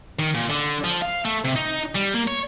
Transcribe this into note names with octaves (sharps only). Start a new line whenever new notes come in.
D#3
A#2
D3
F3
F5
A3
C3
D#4
G3
A#3
C#5